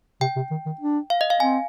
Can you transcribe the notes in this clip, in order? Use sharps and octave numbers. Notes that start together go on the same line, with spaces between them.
C3 G5
C3
D#3
D#3
D4
F5
D#5
F5
C4 G#5